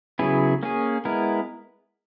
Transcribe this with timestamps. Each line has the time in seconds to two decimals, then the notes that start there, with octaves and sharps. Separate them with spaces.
0.19 C#3 F#3 B3 E4 G#4
0.63 A#3 C#4 G#4
1.05 G#3 B3 E4 A#4